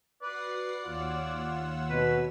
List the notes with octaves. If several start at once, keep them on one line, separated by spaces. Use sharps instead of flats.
F#4 B4 D5 F#5 C7
D#2 F4 C#5 F#5 E6
B2 B4